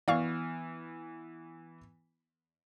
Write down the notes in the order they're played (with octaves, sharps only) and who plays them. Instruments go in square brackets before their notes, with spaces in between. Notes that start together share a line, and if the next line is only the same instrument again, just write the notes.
[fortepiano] E3 B3 F6 [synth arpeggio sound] D5 F5 C#6